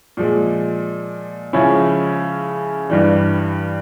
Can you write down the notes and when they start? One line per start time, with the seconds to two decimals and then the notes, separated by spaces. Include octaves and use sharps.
0.17 A#2 F3 G#3
1.53 C#3 F3 G#3 C#4 E4
2.90 G2 E3 G3